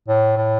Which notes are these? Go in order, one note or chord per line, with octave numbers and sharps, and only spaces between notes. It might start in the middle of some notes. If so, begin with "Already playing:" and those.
A2
A2